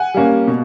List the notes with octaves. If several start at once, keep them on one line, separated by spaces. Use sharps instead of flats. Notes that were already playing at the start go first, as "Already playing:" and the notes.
Already playing: F#5 G#5
G3 A#3 C#4
B2